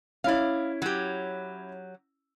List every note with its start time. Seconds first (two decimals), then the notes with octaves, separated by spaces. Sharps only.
0.24 C#4 E4 D5 F5
0.82 F#3 G4